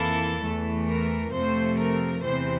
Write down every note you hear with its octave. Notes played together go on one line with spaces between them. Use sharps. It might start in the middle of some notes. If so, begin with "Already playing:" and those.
Already playing: F2 E3 A#3 E4 A4
E2 E3 A3
A#4
F2 C3 F3 A3 C5
A#4
E2 C3 E3 C5